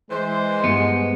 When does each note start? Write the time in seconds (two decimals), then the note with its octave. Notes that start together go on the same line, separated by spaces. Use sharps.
0.11 E3 G#3 C5
0.64 G2 B3